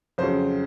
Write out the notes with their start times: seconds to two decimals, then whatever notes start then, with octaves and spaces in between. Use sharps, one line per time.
0.18 F2 C#3 F#3 C5